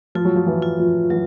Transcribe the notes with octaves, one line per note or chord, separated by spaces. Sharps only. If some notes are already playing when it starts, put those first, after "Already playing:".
F3 F4
F#3
F3
E3
F4
F3
E3 F#3